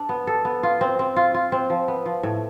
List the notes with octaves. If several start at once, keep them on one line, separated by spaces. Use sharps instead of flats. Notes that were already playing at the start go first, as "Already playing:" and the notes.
Already playing: D4 A4
B3
A4
B3
F4
C4
C4
F4
F4
C4
F3
B3
F3
A2